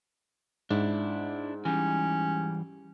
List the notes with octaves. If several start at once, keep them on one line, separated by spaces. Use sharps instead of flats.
G#2 D4 E4
E3 G3 C#4